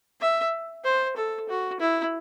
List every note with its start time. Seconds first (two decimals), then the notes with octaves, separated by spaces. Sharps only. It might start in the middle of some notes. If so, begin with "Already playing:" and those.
0.21 E5
0.84 C5
1.16 A4
1.49 F#4
1.80 E4